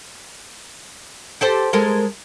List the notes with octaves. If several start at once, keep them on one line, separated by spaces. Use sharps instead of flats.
G4 A4 C5
G#3 A4 A#4